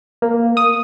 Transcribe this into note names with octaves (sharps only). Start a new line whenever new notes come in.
A#3
D#6